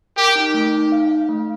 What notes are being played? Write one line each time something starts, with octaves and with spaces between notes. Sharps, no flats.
G4 A#4
D#4
A3
D#4
F5
F5
A3